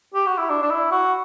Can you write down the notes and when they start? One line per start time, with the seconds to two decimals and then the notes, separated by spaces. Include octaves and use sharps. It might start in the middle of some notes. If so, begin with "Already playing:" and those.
0.14 G4
0.27 F#4
0.38 E4
0.50 D4
0.62 D4
0.71 E4
0.92 F#4